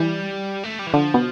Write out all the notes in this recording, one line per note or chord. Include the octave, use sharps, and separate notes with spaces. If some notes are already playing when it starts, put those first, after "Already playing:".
Already playing: E3 G3
A3
G3
E3
D3 F3
B2